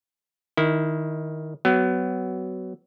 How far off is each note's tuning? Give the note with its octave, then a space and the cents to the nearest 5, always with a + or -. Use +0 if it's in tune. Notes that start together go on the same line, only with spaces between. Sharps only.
D#3 +0 E4 -15
F#3 +20 B3 +20